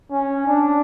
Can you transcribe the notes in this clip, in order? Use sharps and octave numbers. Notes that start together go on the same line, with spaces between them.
C#4
D4